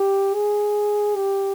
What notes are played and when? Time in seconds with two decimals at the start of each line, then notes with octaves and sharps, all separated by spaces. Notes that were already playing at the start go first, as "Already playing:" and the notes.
Already playing: G4
0.35 G#4
1.16 G4